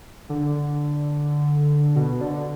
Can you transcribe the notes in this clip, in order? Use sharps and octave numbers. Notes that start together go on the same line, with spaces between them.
D3
B2
D3